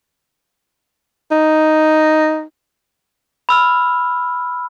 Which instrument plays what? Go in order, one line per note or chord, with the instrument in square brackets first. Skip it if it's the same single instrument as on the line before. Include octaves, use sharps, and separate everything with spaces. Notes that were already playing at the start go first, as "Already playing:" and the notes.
[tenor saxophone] D#4
[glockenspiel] B5 E6 F6